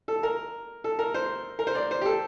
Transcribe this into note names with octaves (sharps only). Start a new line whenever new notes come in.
A4
A#4
A4
A#4
C5
A#4
C5
D5
C5
G4
A4